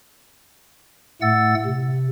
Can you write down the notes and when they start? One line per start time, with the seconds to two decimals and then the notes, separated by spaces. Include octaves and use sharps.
1.22 A2 A3 F#5 E6 A6
1.66 C3